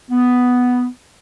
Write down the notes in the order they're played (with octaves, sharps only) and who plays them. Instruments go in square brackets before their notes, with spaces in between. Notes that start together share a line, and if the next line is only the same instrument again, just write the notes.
[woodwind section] B3